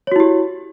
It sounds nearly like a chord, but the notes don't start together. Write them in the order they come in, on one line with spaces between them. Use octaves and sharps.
C#5 F#4 E4 G4